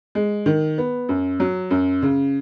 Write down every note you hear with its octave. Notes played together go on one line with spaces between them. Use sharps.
G#3
D#3
B3
F#2
F#3
F#2
C#3